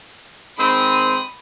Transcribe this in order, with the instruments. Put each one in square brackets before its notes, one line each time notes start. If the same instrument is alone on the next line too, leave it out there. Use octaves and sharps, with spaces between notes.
[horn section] D#3 G#3 C4 [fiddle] B5 D#6